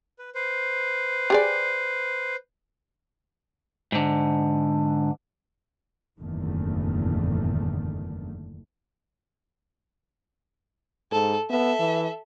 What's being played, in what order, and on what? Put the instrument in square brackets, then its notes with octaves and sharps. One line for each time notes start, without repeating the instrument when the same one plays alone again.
[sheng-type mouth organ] B4
B4 C5
[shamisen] G4 G#4 D5
[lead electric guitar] G#2 D3
[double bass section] F#1 E2 A2 D3 D#3 A3
[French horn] G#2 [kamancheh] A4
[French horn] B3 [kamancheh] A4 E5
[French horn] E3